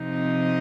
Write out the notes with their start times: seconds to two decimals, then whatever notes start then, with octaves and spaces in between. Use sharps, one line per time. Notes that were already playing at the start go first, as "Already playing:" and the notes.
Already playing: C3 F3 C4 D#4
0.17 D#5